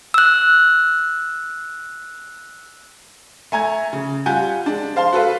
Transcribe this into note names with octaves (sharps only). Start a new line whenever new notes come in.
E6 F#6
A3 G#5 A#5 G#6
C#3
G3 F4 F#5 G#5 G6
G#3 D4
C5 F5 A5 C6
F#4 A4 B4 F5